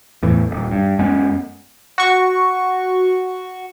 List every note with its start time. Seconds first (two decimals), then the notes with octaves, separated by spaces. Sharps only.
0.22 E2 A2 E3
0.51 D#1
0.71 G2
0.99 F#2 G#3 B3 C#4
1.98 F#4 C#6